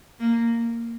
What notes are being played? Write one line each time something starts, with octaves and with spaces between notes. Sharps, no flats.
A#3